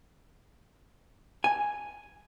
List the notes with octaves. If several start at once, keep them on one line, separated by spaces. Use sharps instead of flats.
G#5